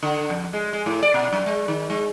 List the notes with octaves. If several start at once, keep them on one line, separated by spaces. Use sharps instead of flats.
D3
F2
G#3
G#3
A2
D5
B2
F#2
G#3
D#3
G#3